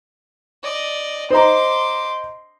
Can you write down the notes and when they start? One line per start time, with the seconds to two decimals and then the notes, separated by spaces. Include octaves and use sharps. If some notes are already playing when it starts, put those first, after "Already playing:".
0.63 D5 D#5
1.30 C5 D#5 A#5 C6 D6